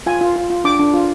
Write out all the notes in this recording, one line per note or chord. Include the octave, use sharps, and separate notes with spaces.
F4 G#5
F4
F4
F4
D4 D6
D4
F4